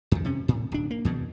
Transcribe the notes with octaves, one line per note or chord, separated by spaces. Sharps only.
F2 D#3
C3 C#4
A2
D1 D4
A#3
E2 B2 D#3